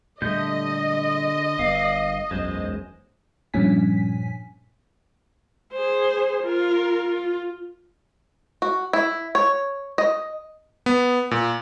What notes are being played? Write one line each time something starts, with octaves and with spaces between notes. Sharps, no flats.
A#2 D3 G3 A3 G4 D#5 G6
G1 B3 F5
E1 B1 F#2 G#3 C5
G2 A#2 F3 C#4 G#5 B6
G#4 C5
F4 A#4
F4
F#4
E4
C#5
D#5
B3
A#2